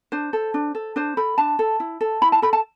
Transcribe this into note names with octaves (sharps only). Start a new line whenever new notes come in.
D4 C5
A4
D4
A4
D4 C5
A4 B5
D4 A5
A4
E4
A4
E4 B5
A5
A4 B5
A5